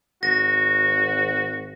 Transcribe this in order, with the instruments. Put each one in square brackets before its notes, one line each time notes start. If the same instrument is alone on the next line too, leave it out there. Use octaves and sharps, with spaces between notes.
[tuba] G#1 [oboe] F#4 [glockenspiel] A#6